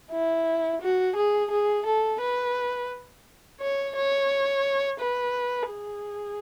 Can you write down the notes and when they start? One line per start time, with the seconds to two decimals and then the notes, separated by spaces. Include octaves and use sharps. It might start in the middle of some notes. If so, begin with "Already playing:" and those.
0.11 E4
0.81 F#4
1.16 G#4
1.51 G#4
1.86 A4
2.21 B4
3.61 C#5
3.95 C#5
5.00 B4
5.70 G#4